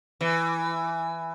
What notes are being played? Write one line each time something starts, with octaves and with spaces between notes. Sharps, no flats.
E3